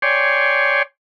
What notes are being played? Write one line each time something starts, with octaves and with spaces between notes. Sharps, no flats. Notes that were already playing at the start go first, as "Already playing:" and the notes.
C#5 D5 G5 G#5 C6